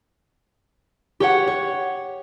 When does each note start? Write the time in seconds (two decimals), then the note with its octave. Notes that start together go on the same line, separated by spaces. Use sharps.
1.20 G4 C#5 F#5
1.47 C#5